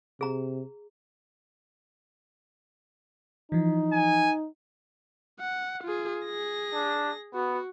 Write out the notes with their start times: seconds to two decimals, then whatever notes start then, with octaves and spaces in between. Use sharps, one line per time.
0.21 C3 G#4 A#5
3.52 E3 F3 D#4
3.93 G#5
5.40 F#5
5.83 F4 G#4
6.25 G#4 A#6
6.74 D4
7.34 B3 F#4